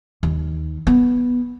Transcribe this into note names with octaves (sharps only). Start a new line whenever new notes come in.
D#2
B3